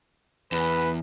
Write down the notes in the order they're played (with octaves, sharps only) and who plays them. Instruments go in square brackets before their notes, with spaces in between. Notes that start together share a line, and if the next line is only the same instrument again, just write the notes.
[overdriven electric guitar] E2 [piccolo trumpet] B4